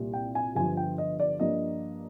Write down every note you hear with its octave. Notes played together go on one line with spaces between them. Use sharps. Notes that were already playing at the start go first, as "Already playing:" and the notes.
Already playing: C2 A#2 G3
G5
G#5
G1 G2 F3 G#5
G5
D#5
D5
G2 F3 A#3 D4 D#5